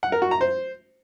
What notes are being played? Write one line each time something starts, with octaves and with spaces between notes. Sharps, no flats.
F#5
A#4
F#4
A#5
C5